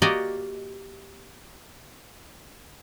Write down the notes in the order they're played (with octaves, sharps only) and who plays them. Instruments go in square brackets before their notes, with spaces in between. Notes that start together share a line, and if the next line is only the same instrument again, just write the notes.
[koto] A#3 F#4 G4 A#4 D5 D#5